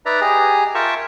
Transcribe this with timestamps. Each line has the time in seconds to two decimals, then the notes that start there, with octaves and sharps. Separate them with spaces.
0.06 D#4 B4 D5 E5 A#5
0.21 G4 G#4 D#5 G#5 A#5
0.75 F4 A#4 E5 G5 A5 C#6